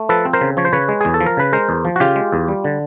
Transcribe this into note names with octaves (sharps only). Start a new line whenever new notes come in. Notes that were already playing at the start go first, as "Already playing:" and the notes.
Already playing: A3
F3 A4 B4
C4
A#4 C5
C#3
F3 C#5
C5
C#3 B4 C#5
G#3
E2 G#4
A4
F3
A#4
C#3 B4
G#3 A#4 C5
E2
F3
F#4
C#3 F4 G4
G#3
E2
G3
D3